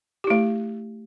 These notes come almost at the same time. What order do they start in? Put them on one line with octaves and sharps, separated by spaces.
G4 E4 A3